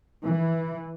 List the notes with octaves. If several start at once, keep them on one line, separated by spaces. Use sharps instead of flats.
E3